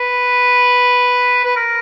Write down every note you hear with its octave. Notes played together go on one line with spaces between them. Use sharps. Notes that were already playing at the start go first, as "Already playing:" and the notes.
Already playing: B4
B4
A#4